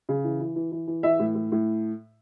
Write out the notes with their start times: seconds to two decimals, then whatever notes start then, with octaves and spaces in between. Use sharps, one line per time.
0.09 C#3
0.24 E3
0.40 E3
0.56 E3
0.72 E3
0.88 E3
1.03 E3 E5
1.20 A2
1.35 A2
1.52 A2